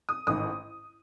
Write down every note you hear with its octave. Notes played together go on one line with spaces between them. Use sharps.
D#6
A1 G#2 D#3 D#6